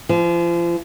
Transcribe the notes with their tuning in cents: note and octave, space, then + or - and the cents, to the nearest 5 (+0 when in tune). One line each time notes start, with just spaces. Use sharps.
F3 -35